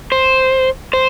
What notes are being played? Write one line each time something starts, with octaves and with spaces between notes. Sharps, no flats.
C5
C5